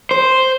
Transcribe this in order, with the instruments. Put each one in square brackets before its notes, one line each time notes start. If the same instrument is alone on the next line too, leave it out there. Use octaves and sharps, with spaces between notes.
[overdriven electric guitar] C5